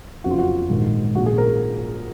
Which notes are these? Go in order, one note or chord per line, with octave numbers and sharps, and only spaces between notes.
F#1 F2 C#3 F#4
F4
F#4
A#1 G#2 D#3
A#1 A#2 F#4
G#4
A#4